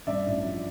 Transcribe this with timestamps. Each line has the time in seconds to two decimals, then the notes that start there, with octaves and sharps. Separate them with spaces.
0.07 G2 D5 E5
0.26 A1
0.45 F3